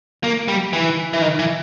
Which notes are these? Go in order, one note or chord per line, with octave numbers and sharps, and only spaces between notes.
A#3
G3
E3
E3
D#3
E3